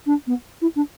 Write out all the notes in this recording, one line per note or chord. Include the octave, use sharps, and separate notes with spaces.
D4
B3
E4
D4